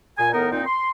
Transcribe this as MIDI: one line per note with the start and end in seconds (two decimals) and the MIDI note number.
0.18 0.29 46
0.18 0.29 80
0.33 0.51 45
0.33 0.51 51
0.33 0.51 59
0.33 0.51 63
0.33 0.51 70
0.52 0.62 46
0.52 0.62 60
0.52 0.62 63
0.66 0.90 84